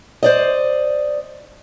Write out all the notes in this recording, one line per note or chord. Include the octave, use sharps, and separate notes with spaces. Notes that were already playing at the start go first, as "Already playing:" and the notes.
C5 D5 D#5